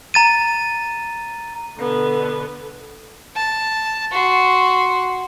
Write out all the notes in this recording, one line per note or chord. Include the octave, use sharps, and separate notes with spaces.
A#5 A6 D#7
B2 D3 B3
A5
F#4 C6